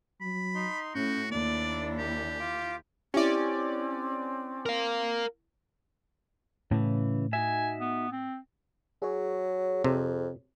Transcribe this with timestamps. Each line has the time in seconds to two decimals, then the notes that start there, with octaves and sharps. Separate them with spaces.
0.21 F#3 B5
0.54 D#4 C6
0.95 A2 C#4 F#4 G6
1.31 D#2 A#3 D4 E4 D5
1.98 G4
2.39 F4 D6
3.14 C4 C#4 E4 G4 D5
4.66 A#4 F5
6.71 A2 C#3 E3
7.33 D#4 F#4 E5 G#5
7.80 B3
8.12 C4
9.02 F#3 G#4 C#5
9.84 F2 C3